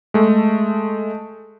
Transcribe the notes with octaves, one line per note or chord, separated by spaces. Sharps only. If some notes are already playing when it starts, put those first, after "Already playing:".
G#3 A3